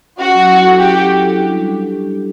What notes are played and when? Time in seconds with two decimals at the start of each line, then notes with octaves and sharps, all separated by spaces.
0.18 C#4 F#4
0.34 F#3
0.48 E4
0.64 A4
0.78 C#4 G4
0.93 F#3
1.07 E4
1.22 A4
1.37 D4
1.52 G3
1.67 G4